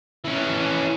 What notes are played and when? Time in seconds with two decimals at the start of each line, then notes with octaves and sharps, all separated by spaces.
0.25 E3 C#4